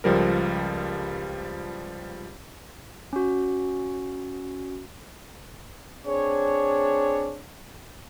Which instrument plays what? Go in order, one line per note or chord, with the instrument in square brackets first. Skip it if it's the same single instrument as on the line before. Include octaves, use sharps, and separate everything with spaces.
[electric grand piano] C#2 F3 G3 A#4
[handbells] C#4 F#4
[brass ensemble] C4 D4 G#4 C#5